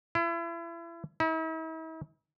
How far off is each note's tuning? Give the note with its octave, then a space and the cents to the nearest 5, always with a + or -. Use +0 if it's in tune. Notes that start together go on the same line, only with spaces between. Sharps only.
E4 +35
E4 -45